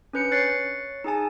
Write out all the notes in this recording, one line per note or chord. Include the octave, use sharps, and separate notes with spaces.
C#4 D4 B4 G6 C#7
C#5 F#6 A6 C7 C#7
D#4 G#4 G#5 A5